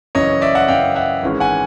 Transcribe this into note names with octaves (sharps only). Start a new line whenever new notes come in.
F#2 C#3 E3 C#5 D#5
D5 E5
E5 F#5
F#2 C#3 E3 F5 G5
E5 F#5
G#1 G#2 E3 G#3 C#4
F#5 G#5